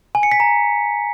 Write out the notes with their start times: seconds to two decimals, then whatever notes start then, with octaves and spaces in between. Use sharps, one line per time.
0.15 G#5
0.23 C#7
0.32 B6
0.40 A#5